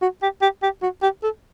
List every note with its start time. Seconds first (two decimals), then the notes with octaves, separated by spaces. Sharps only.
0.02 F#4
0.22 G4
0.42 G4
0.63 G4
0.82 F#4
1.02 G4
1.23 A4